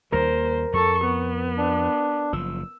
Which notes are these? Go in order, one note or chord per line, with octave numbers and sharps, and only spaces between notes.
D#2 G3 A#3 A#4 C5
F2 A4 C#6
B3
D4
F#1 F3 E6